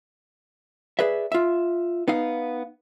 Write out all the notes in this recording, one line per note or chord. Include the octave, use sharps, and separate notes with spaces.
G#4 B4 D5 E5
F4 E5
B3 D#4 F5